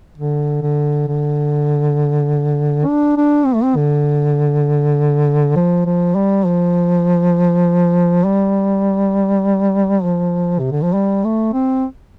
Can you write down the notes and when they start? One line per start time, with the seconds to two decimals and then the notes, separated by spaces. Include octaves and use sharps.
0.18 D3
0.62 D3
1.08 D3
2.87 D4
3.17 D4
3.46 C4
3.55 A3
3.63 C4
3.76 D3
5.56 F3
5.86 F3
6.15 G3
6.46 F3
8.26 G3
10.04 F3
10.59 C3
10.72 D3
10.83 F3
10.93 G3
11.25 A3
11.54 C4